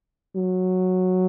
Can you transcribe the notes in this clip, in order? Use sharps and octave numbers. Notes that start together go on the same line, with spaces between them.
F#3